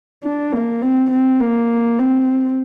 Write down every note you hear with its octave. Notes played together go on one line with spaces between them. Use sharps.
D4
A#3
C4
C4
A#3
C4